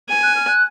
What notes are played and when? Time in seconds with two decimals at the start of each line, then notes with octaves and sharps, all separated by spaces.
0.09 G#5
0.23 F#6
0.35 F6
0.48 F#6